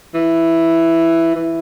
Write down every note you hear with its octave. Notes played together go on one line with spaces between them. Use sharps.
E3
E3